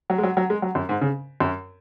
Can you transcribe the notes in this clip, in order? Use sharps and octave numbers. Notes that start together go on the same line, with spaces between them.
F#3
G#3
F#3
F#3
G#3
F#3
F#2
G#2
C#3
F#2